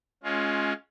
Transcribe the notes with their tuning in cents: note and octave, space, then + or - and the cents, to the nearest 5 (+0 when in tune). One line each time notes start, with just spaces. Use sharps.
G#3 +20 C#4 +0 F4 +15